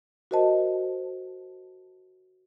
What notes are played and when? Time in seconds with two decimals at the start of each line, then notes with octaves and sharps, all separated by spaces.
0.31 F#4 A#4 C5 D#5 A5